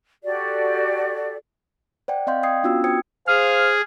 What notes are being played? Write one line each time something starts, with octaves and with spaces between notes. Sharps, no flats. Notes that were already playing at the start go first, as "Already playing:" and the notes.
F#4 G4 A4 D5
C5 D5 F#5 G5
C4 D5 D#5 F5 C6 G6
F5 G5 D#6 G#6 C7
B3 C#4 D4 F4 F#4 E6
C5 G5 D#6 G#6 C#7
G#4 C5 F5 F6